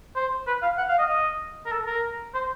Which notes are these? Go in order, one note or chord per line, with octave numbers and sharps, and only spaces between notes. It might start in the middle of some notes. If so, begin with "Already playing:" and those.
C5
B4
F5
F#5
F5
D#5
D#5
A#4
A4
A#4
C5